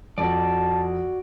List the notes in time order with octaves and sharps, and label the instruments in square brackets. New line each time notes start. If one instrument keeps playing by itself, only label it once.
[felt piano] F2 [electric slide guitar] F#4 D5 [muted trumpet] A5